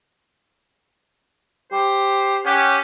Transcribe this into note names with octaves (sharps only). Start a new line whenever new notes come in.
G4 C5
C#4 G4 F#5